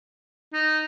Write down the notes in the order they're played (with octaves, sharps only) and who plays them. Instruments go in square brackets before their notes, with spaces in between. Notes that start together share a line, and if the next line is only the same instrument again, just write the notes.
[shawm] D#4